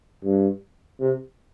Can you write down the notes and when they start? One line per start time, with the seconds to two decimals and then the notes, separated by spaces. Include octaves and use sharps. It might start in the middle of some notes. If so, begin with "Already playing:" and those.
0.24 G2
1.00 C3